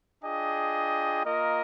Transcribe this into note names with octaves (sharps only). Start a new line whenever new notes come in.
D4 F4 G#4 D#5 G5
A#3 F4 A#4 D#5